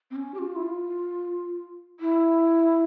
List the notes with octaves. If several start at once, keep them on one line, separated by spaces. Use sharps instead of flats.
C4
C#4
G4
F4
E4
F4
E4